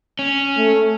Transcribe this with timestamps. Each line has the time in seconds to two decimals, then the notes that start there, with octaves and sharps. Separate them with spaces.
0.19 C#4
0.57 A3